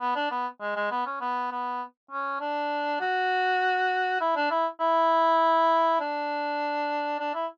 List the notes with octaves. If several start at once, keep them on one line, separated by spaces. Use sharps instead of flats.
B3
D4
B3
G#3
G#3
B3
C#4
B3
B3
C#4
D4
F#4
E4
D4
E4
E4
D4
D4
E4